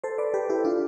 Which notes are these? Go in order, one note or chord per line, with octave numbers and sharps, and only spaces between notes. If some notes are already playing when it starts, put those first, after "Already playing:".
A4 C5
B4 D5
G4 B4
E4 G4
D4 F4